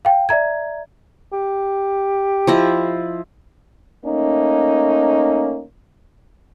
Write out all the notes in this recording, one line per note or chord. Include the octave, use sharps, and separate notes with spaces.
F5 G5
D5 E5 A#5 G#6
G4
F3 E4 D#5
A3 A#3 C#4 D#4